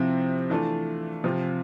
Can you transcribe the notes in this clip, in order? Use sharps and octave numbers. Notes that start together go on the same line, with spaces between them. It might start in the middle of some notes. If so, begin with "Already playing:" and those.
Already playing: C3 F3 C4 E4
E3 A3 D4 F4
C3 F3 C4 F4